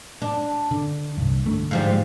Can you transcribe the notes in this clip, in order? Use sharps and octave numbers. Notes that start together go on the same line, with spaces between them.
D4
D3
C2 G2
D3 A3
G#2 F3 G3